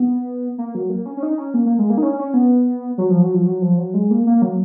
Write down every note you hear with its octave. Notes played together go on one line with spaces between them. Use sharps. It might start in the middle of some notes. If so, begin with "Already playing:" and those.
Already playing: B3
A#3
F#3
A#3
C#4
C#4
D#4
C#4
A#3
A#3
G#3
A#3
D#4
C#4
C#4
B3
F#3
F3
F#3
F3
F#3
F3
F#3
G#3
A#3
A#3
F#3